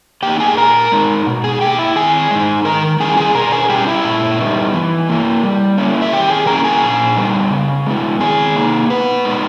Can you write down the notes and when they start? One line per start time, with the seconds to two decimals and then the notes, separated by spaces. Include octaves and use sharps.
0.23 A#3 D#4 G4 G5
0.40 G#4 G#5
0.57 A#2 A#4 A#5
0.92 G#3 D#4
1.27 B2
1.44 G#4 G#5
1.61 A#3 D#4 G4 G5
1.78 E4 E5
1.96 D#3 G#4 G#5
2.31 G#3 D#4
2.65 D#3 A#4 A#5
3.00 G3 C#4 E4 G#4 G#5
3.17 G#4 G#5
3.35 B2 A#4 A#5
3.52 G#4 G#5
3.69 G3 C#4 G4 G5
3.87 E4 E5
4.04 A#2
4.39 G3 B3 D#4
4.74 E3
5.09 A#3 E4
5.43 G3
5.77 A#3 C#4 E4
6.02 E5
6.12 D#3 G4 G5
6.30 G#4 G#5
6.47 A#3 C#4 E4 A#4 A#5
6.64 G#4 G#5
6.82 A#2
7.16 G3 B3 D#4
7.51 C#3
7.86 G#3 B3 E4
8.20 D#3 G#4 G#5
8.56 A#3 D#4
8.90 B2 B3 B4
9.25 G#3 D#4